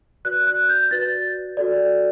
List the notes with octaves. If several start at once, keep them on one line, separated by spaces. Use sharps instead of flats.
F#4 B4 D5 F#6
F#6
G6
F#4 B4 D5 A6
F#4 A4 D5